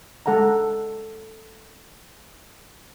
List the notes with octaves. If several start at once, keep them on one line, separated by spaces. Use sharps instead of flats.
G#3 A4 F#5 A5 A#5